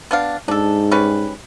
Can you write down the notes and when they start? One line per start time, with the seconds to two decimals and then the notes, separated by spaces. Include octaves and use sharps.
0.11 B3 D4 F5
0.48 G#2 D4 A4
0.91 G3 C#4 B4